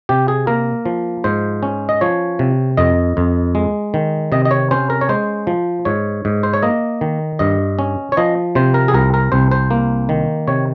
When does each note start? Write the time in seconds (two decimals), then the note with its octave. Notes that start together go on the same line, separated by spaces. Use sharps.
0.09 C3 G4
0.28 G#4
0.47 A#3 A#4
0.85 F3
1.24 G#2 C5
1.63 C#4
1.89 D#5
2.01 F3 C#5
2.39 C3
2.77 F2 D#5
3.17 F2
3.55 G#3
3.94 D#3
4.32 C3 D#5
4.45 D#5
4.51 C#5
4.71 C#4 C5
4.90 A#4
5.01 C#5
5.09 G#3 C5
5.47 F3
5.85 G#2 C#5
6.25 G#2
6.43 C5
6.53 C#5
6.62 A#3 D#5
7.01 D#3
7.39 G2 D#5
7.79 C#4
8.12 C#5
8.17 F3 D#5
8.55 C3 C5
8.74 A#4
8.88 G#4
8.94 C2 A#4
9.14 A#4
9.32 C2 C5
9.52 C5
9.71 A#3
10.09 D#3
10.47 C3 C#5